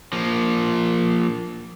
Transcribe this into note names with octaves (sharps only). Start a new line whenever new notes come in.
F3 A#3